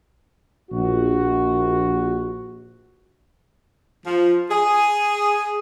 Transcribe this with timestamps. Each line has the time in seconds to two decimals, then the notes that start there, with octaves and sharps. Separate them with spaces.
0.71 A#1 F#4
4.06 F3
4.50 G#4